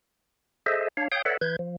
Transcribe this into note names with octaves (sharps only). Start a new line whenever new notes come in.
G#4 A4 C5 D#5 E5
D4 C#5 F5
C#5 F5 G5 D#6 G6
A4 B4 C#5 D5 E5 F#5
E3 B4 G6 G#6
F3